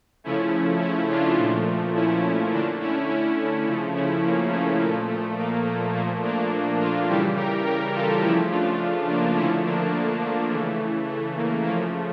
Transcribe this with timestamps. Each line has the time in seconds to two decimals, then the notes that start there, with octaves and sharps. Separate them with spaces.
0.24 C#3 F3 A3 C#4 E4
0.81 C#4 E4
1.09 D4 F4
1.38 A#2 F3 A3
1.94 C#4 E4
2.52 D3 A3 A#3 D4
2.80 C#4 E4
3.09 C#4 E4
3.66 C#3 F3 A3
3.94 C#4 E4
4.23 A#3
4.52 A3 C#4
4.80 A#2 F3 A3 A#3
5.08 A3
5.37 A#3
5.66 A3
5.94 A#2 F3 A3 A#3
6.22 A#3 D4
6.80 D4 F4
7.08 C#3 E3 G3 E4 G4
7.36 G4 A#4
7.65 G4 A#4
7.94 F4 A4
8.22 C#3 F3 A3 E4 G4
8.51 D4 F4
9.08 A#3 D4
9.36 D3 F3 A3 C#4 E4
9.64 A#3 D4
9.93 A#3
10.22 A3
10.50 C#3 E3 A3
11.07 A3
11.36 A#3
11.64 C#3 F3 A3 A#3